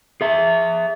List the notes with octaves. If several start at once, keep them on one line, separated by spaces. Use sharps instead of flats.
G#4 E5